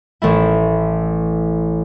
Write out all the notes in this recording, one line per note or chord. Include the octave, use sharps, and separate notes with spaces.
A1 A3 E4